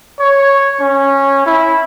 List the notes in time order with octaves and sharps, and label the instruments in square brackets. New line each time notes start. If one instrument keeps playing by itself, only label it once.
[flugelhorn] C#5
C#4
E4